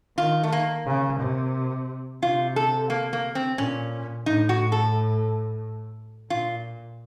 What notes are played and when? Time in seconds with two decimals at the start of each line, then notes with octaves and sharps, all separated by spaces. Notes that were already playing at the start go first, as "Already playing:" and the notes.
0.18 D#3 F4
0.43 A3
0.52 A#3
0.86 C#3
1.20 C3
2.23 C3 F4
2.56 A4
2.90 A#3
3.13 A#3
3.35 C4
3.58 A#2 C#4
4.26 A2 D#4
4.49 F#4
4.72 A4
6.30 A#2 F4